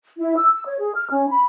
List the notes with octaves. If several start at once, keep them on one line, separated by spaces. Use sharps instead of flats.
E4
E6
E6
C#5
G#4
F6
C#4
B5